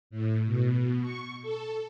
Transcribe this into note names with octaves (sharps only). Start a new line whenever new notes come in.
A2
B2
C#6
A4